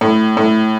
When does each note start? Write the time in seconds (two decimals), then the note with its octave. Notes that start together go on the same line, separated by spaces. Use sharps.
0.01 A2
0.37 A2